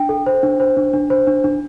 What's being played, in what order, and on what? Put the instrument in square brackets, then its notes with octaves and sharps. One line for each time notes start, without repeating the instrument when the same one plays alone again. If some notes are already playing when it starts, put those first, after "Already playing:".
Already playing: [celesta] D4 G5
A4
C5
D4
C5
D4
D4
C5
D4
D4